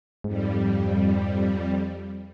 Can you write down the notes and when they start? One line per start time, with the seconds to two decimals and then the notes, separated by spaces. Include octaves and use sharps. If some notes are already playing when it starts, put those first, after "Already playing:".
0.24 F2 G#2 G3